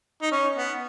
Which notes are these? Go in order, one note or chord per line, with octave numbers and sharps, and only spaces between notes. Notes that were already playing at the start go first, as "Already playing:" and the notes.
D#4
C#4
B3